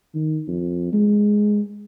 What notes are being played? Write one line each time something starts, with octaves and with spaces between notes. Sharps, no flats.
D#3
F2
G#3